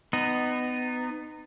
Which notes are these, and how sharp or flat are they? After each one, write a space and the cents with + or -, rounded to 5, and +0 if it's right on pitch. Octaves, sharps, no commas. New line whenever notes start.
B3 +20 D#4 -15